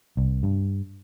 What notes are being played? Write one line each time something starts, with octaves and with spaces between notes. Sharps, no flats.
C2
G2